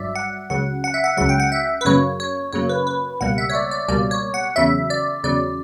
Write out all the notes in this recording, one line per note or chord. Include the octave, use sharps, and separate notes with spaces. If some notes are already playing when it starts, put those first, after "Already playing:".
Already playing: G1 G2 F#3 D5 E5
F#5
C#2 C#3 F#3 F#5
F#5
E5
F#5
C#2 C#3 F#3 F#5
G5
F#5
E5
B4
F#2 C#3 F#3 A#3 C#5
C#5
F#2 C#3 F#3 A#3 C#5
B4
B4
C#2 B2 G3 A#3 F#5
E5
C#5
D5
D5
C#2 B2 G3 A#3 D5
C#5
F#5
E2 C#3 F#3 E5
D5
E2 C#3 F#3 D5